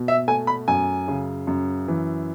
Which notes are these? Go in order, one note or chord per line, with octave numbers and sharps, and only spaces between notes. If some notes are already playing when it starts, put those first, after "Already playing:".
Already playing: B2
E5
A3 G#5
B5
F#2 G#5
C#3
F#2
E3